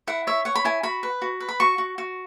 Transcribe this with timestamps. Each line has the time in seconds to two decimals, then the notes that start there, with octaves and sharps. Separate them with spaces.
0.07 E4 F#5
0.27 C#5 E5
0.45 C#5 F#5
0.55 B5
0.65 E4 G#5
0.83 F#4 B5
1.03 B4
1.22 F#4
1.40 B4
1.49 B5
1.60 F#4 C#6
1.78 F#4
1.98 F#4